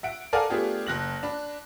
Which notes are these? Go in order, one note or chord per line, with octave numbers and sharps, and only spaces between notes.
E5 F#5 D7
A4 A#4 D5 F5 F#5 G#5
A3 B3 D4 F4 G4 G#4
F#1 F#6 A#6 F#7
D4 B5